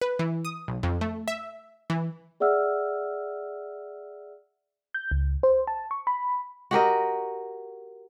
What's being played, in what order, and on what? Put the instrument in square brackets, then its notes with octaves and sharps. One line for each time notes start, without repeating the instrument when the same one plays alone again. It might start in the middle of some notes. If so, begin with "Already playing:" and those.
[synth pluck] B4
E3
D#6
B1
F2
A3
E5
E3
[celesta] G#4 D5 E5 F#5 E6 F6
[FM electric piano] G6
C#2
C5
A5
C#6
B5
[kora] F#4 G4 A#4 D#5